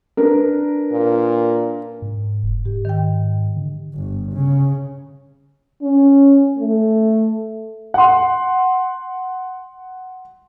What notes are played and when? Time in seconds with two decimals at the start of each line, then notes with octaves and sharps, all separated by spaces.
0.17 D4 A#4 B4
0.92 A#2
2.02 G#2
2.44 F1
2.65 G#2 G4
2.85 D#3 G5
3.57 D3
3.95 G1
4.33 C#3
5.82 C#4
6.59 A3
7.94 F#5 C6